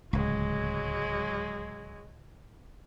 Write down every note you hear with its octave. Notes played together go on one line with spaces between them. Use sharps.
D1 C#2 F#3 G#3